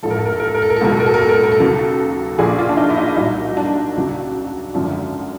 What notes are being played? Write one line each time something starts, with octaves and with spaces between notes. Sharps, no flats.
A1 G#2 F3 A4
A#4
A4
A#4
A4
A#4
A4
A#4
A4
A#4
A4
C#2 B2 F#3 A#4
A4
A#4
A4
A#4
A4
A#4
A4
A#4
A4
D#2 C#3 F#3
A#1 A#2 F3 G#4
F4
D4
D#4
E4
D#4
C2 A#2 F#3 D#4
D4
D#2 C#3 F#3
G#1 F#2 D3 F3